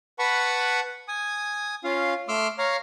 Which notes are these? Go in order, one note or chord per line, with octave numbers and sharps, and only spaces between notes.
B4 F#5 A5 B5 C#6
G#5 D#6
C#4 F4 F5
A3 C6 D6 E6 F6
C#5 F5 A#5 F6